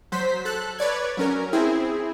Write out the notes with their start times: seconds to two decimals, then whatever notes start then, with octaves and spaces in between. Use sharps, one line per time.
0.12 F#3 C5 B6
0.45 A4 F#6
0.79 B4 C#5 D5 G#6
1.17 F#3 C#4 A#4
1.53 C4 E4 G#4